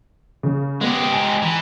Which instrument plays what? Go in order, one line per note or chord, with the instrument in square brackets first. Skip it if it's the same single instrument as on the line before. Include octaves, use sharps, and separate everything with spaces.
[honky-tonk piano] C#3
[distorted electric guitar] G#3 G4 [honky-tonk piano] B3
[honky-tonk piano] G#5 A#5
[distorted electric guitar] E3